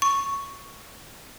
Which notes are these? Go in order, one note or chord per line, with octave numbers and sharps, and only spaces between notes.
C#6